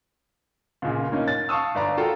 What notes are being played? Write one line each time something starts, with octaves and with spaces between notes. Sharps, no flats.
C#2 A#2 C#3
A#3 C#4 D#4 D#5
A6
F5 A5 C#6 D#6 E6
G1 D5 A#5
F4 F#4 A4 G5 A#5